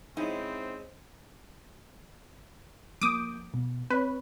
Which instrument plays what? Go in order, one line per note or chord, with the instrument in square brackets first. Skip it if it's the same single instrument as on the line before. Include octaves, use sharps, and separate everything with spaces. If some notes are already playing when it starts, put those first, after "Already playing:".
[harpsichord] C#3 G#3 [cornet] C4 [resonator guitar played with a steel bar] D#4 E4 [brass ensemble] C5
[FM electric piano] F3 A#3 G6 [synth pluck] D6 D#6
[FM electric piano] B2
[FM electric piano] C4 C#5 [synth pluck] B4